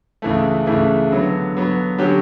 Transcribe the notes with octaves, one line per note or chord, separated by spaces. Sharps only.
C#2 C#3 E3 A3
C#2 C#3 E3 A3
D3 F#3 B3
D3 F#3 B3
D3 F#3 C#4 G4